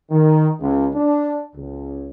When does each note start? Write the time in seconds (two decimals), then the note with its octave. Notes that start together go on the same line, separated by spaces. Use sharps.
0.10 D#3
0.60 C#2
0.95 D4
1.54 C#2